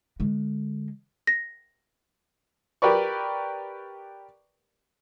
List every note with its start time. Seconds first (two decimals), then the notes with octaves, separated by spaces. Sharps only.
0.20 D3 G#3
1.27 A#6
2.82 G4 A#4 B4 D5 C#6